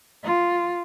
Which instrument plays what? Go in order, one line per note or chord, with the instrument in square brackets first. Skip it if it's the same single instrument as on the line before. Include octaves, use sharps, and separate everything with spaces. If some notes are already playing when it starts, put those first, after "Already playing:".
[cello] F4